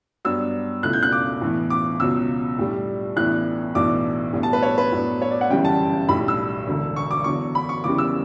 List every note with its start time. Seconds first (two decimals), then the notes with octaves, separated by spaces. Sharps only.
0.25 G2 F#3 B3 D4 E6
0.83 C#2 B2 A3 E4 F#6
0.93 G6
1.03 F#6
1.12 D6
1.41 A2 E3 B3
1.70 D6
2.00 C#2 B2 F#3 E6
2.59 A2 G3 D4
3.16 A1 A2 E3 B3 D4 F#6
3.75 B1 A2 E3 B3 D4 D6
4.33 A2 G3 B3 D4
4.43 A5
4.53 B4
4.63 C#5
4.78 B4
4.92 A2 F#3 B3 D4
5.22 C#5
5.31 D5
5.41 F#5
5.50 G1 F#2 C#3 E3 G3 G5
5.65 A5
6.08 B1 A2 G3 D4 B5
6.28 E6
6.67 E1 D2 D3
6.96 C#6
7.11 D6
7.24 E2 D3 F#3 C#6
7.55 B5
7.69 C#6
7.84 F#1 E2 C#3 E3 G3 D6
7.98 E6